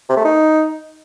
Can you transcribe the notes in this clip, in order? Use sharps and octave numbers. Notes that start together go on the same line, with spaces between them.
C3
A3
D#4